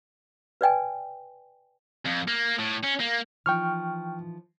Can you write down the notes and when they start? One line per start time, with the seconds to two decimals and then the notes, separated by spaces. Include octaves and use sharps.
0.61 B4 D5 G5 G#5
2.05 F2
2.28 A#3
2.59 A2
2.84 C#4
3.00 A#3
3.46 E3 F3 D#4 G5 C#6 F6